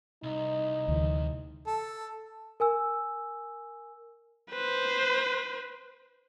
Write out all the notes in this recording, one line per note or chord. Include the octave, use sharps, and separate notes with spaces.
C2 D#4
D2 E3
A4
A#4 G#5 E6
B4 C5